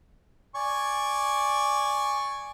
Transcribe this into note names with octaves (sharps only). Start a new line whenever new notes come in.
D5 G#5 C#6